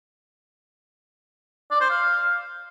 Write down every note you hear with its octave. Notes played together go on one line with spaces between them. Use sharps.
D5
C5
F5